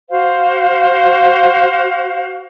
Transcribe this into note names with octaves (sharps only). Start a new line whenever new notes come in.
F#4 C5 F5